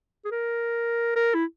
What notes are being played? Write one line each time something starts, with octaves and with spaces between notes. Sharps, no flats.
G#4
A#4
A#4
E4